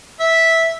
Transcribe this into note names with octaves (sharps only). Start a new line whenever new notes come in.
E5